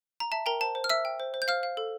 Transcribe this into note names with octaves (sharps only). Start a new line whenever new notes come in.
A#5
E5 A5
A#4 G5 A#5
C5 A5
C5
F6
E5 E6
G5
C5
C5
G6
C5 F5 F6
F5
A4